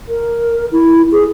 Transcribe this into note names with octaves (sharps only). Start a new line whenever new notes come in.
A#4
E4
G#4